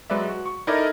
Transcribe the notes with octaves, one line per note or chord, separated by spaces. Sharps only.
F#3 G#3 B4 D5 E5
F#4
C#6
D#4 E4 A4 A#4 D5 D#5